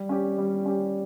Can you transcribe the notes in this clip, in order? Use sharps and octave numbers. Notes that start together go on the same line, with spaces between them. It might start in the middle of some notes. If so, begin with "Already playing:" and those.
Already playing: G3
C#4 G4
G3
C#4 G4